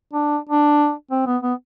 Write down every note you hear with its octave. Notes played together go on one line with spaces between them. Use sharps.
D4
D4
C4
B3
B3